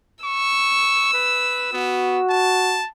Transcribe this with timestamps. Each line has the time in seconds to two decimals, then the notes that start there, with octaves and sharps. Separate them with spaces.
0.24 C#6 E6
1.14 B4
1.73 B3 F#4
2.30 A5